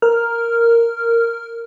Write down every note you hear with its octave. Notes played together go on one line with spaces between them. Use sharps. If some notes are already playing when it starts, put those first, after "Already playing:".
A#4 F6